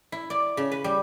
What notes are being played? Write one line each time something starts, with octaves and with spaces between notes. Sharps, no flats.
E4
D5
C#3
B4
G3